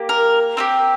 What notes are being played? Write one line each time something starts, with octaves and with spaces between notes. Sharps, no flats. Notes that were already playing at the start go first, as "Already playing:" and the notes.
Already playing: A#3 G4
A#4
C4 D#4 G4